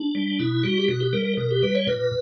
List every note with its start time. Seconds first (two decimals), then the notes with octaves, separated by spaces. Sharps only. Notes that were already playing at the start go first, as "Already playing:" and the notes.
Already playing: D4
0.15 G3
0.39 B2 E4
0.63 G3 F#4
0.78 G4
0.88 B2 F#4
1.00 G4
1.13 G3 A#4
1.25 A#4
1.37 B2 A#4
1.51 G4
1.62 G3 B4
1.75 C#5
1.87 A#2 B4